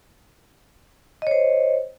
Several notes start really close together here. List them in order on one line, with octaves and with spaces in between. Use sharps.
D#5 C#5 C5